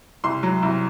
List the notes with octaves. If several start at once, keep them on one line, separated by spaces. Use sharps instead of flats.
C2 C6
F#3
C2